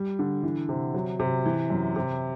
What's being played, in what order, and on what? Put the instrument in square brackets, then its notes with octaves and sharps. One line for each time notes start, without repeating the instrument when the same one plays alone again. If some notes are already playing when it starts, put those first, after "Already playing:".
Already playing: [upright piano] G3
D3
E3
C3
F#3
C3
E3
F#2
C3